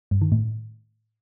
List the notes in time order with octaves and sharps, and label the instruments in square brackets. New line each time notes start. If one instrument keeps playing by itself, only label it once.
[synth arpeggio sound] G2
D#3
A2